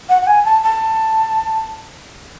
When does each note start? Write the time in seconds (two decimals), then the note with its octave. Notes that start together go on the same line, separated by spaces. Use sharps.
0.09 F#5
0.22 F#5
0.27 G#5
0.45 A5
0.63 A5